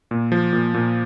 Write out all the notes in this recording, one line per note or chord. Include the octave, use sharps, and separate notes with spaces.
A#2
F3
A#2
A#2